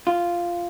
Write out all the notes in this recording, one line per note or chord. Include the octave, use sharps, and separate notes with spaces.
F4